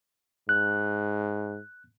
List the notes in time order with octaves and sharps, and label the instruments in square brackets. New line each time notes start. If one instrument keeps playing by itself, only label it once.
[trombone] G#2 [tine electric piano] F#6